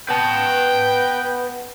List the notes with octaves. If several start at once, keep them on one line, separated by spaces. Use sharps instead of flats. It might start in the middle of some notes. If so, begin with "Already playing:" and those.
B3 B4 G5 A5